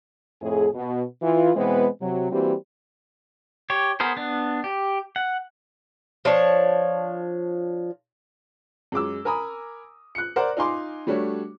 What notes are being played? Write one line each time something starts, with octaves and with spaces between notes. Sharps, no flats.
F2 A2 A3 G#4
B2
E3 F4
B2 E3 G#3 B3 C4 B4
C3 F#3
E3 G3 A#3 C4 F#4 G4
G4 C#5
B3 G#4 A#4 C5
B3 D4
G4
F#5
F3 D4 C#5
F#2 G#3 D6 E6
A#4 G#5 A#5 B5 D#6
F#6 C#7
A#4 C5 D5 F#5
D#4 F4 G#5 C6 D6
G3 A3 D4 F#4 C#5